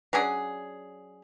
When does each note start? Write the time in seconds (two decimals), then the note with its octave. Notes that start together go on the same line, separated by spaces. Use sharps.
0.13 F#3 C#4 D4 G#4